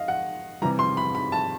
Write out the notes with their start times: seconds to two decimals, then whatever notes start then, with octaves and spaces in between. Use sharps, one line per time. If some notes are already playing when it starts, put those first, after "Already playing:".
Already playing: D#5 F5
0.08 F#5
0.62 C3 E3 G3 A#5
0.79 C6
0.97 B5
1.15 B5
1.32 A5